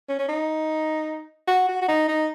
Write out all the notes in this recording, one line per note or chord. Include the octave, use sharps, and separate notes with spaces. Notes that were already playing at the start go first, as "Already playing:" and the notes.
C#4
C#4
D#4
F#4
F#4
F#4
D#4
D#4